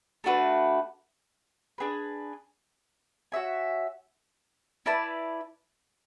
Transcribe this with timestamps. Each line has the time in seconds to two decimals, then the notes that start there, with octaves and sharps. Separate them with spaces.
0.24 A3 D4 F#4 B4
1.78 D4 G#4 B4
3.32 F#4 C#5 E5 G#5
4.86 E4 B4 D5 A5